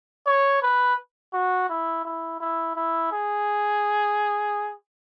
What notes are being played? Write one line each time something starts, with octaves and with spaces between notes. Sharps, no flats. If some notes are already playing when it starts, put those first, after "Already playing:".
C#5
B4
F#4
E4
E4
E4
E4
G#4